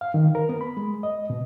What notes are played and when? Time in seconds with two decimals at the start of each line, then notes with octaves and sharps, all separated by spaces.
0.01 F5
0.14 D#3
0.35 A#4
0.49 B3
0.61 B5
0.77 G#3
1.03 D#5
1.30 B2